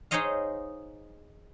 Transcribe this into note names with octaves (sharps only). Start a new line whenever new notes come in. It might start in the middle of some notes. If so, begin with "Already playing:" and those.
D#4 G#4 C5 C#5 D#5 F5